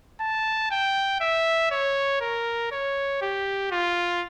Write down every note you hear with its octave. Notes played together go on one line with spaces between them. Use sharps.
A5
G5
E5
C#5
A#4
C#5
G4
F4